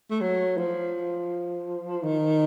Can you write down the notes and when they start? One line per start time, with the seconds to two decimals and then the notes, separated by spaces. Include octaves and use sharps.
0.10 A3
0.21 F#3
0.58 F3
2.03 D#3